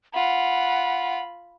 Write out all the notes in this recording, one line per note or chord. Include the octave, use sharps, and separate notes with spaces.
F4 F#5 B5